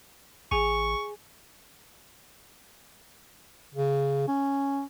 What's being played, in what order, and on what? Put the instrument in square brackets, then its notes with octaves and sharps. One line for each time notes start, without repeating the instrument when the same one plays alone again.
[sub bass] A1 [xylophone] G#4 G#5 [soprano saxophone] C#6
[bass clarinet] C#3
C#4